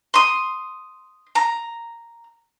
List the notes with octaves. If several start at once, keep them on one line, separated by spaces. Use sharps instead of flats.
C6 D#6
A#5